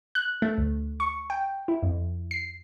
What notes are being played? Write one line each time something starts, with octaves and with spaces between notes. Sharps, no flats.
F#6
A3
D2
C#6
G5
E4
F2
C7